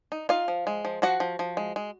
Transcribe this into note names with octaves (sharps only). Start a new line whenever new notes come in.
D#4
D#4 F4 F5
F3
G#3
F3
F3 F#4 F#5
F3
F3
G#3
G#3